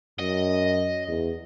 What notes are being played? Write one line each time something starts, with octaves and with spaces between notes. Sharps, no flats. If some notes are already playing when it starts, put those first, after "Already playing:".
F#2 D#5
E2